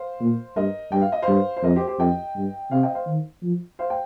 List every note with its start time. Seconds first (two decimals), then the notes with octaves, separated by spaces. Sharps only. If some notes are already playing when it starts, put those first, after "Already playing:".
Already playing: C5 F5
0.20 A#2
0.56 G2 A#4 D#5
0.92 G2 G5
1.01 F5
1.12 D#5
1.22 C5 F5
1.28 G2
1.57 C5
1.63 F2 A#4 D#5
1.76 G4 C5
1.87 G4 C5
1.99 F2 D#5 G5
2.36 G2
2.71 C3 C5 F5
2.83 D#5 G5
2.95 C5 F5
3.06 D#3
3.43 F3
3.79 C5 F5
3.90 G5